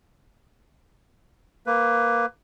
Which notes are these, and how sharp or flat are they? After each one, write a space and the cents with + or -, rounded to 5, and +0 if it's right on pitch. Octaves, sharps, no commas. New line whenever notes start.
A#3 +5 B4 +15